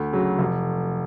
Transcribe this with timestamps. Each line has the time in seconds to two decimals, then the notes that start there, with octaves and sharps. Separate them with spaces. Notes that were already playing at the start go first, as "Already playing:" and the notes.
Already playing: D2
0.13 C#3 F#3
0.39 F1